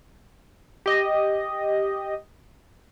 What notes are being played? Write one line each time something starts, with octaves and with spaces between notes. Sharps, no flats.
G4 D#5